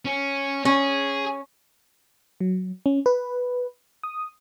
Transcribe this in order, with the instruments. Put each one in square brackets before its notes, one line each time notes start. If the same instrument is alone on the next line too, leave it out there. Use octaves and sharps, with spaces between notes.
[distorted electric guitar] C#4
[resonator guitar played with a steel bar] C#4 [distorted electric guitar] G#4
[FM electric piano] F#3
C#4
B4
D#6